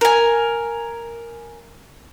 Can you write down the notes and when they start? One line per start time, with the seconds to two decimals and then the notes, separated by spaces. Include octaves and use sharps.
0.01 A#4 G#5